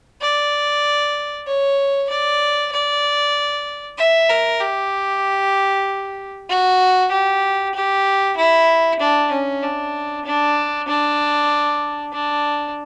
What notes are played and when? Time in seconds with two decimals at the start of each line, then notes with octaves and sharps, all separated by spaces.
0.21 D5
1.47 C#5
2.10 D5
2.72 D5
3.98 E5
4.29 A#4
4.60 G4
6.49 F#4
7.11 G4
7.75 G4
8.37 E4
9.00 D4
9.31 C#4
9.62 D4
10.25 D4
10.88 D4
12.13 D4